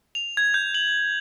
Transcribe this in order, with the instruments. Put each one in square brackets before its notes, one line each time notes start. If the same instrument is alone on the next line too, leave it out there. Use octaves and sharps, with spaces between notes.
[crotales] F7
G#6
G6
F#7